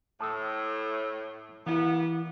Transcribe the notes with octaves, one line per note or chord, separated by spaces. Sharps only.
A2 A5 D#6 E6
E3 G3 A#3 B3 E4